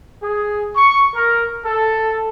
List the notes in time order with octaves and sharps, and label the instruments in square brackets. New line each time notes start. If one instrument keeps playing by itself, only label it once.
[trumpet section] G#4
C#6
A#4
A4